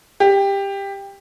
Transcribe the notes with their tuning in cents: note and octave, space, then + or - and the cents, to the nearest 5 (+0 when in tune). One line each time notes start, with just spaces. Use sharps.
G4 +15